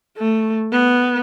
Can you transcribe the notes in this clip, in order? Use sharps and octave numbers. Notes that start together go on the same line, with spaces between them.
A3
B3